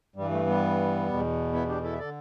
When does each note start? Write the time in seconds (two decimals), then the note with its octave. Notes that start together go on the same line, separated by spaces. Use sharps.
0.16 G2 E3 G3
0.31 A3
0.46 G3 B3
1.08 E2 B2
1.53 B3 E4
1.68 D4 G4
1.83 E4 A4
1.93 E5
1.98 D3 A4 D5